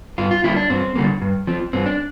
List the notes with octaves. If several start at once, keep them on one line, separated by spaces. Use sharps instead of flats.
G2 F4
F4
D3 G3 A#3 E4
D4
G2 C4
D3 G3 A#3
G2
F3 C4
G2 C4
D4